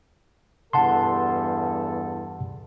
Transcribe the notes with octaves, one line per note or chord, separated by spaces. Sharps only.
E2 G2 A4 F#5 A5 C6